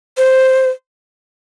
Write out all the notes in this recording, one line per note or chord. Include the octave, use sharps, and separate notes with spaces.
C5